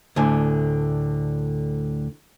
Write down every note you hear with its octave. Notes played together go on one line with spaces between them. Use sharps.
D2 A2 D3 G#5